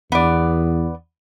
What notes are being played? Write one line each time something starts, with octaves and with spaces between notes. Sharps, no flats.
E2 B3 D5